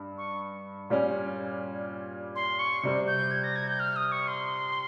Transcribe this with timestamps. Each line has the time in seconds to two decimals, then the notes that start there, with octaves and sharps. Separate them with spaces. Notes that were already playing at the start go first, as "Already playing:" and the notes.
Already playing: G2
0.18 C#6
0.90 A#2 G3 C#4
2.35 C6
2.59 C#6
2.83 C3 G3 C4
3.07 G6
3.31 G#6
3.44 A#6
3.56 G#6
3.67 G6
3.80 F6
3.96 D#6
4.12 C#6
4.28 C6